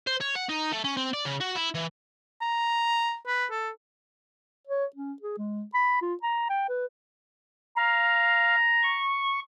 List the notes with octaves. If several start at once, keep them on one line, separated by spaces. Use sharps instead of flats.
C5
C#5
F#5
D#4
A3
C#4
C4
D5
C#3
F#4
E4
E3
A#5
B4
A4
C#5
C#4
G#4
G#3
B5
F4
A#5
G5
B4
F5 A#5
C#6